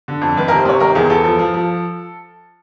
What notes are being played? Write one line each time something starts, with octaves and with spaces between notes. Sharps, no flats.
D3
F2
D#3 B4
C3 A#4
C5
C3 C#5
D#3 A#4
E2 G#4
E2 A4
F3 A4
F3
F3